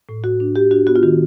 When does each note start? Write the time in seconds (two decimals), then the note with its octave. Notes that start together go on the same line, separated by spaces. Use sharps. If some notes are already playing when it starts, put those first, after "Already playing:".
0.09 A2
0.24 A2 F#4
0.40 D4
0.55 D4 G4
0.71 D4 F#4
0.87 B3 F#4
0.96 F4
1.03 D#3 F#4